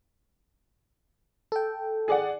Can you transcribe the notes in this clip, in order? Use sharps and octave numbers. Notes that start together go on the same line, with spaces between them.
A4 G5
G#4 D5 F#5